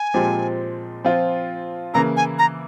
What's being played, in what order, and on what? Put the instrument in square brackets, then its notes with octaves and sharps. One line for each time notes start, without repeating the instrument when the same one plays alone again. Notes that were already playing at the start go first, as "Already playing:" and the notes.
Already playing: [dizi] G#5
[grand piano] A#2 F3 G#3 C4 G4
F3 C4 F4
[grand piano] C#3 E3 A#3 E4 [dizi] A#5
[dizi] G#5
A#5